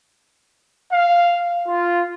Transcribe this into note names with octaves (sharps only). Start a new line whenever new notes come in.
F5
F4